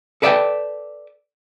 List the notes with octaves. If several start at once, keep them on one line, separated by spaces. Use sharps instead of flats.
A4 B4 D5 E5 F5 G5